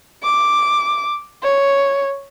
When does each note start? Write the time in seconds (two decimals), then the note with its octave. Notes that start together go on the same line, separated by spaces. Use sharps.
0.23 D6
1.43 C#5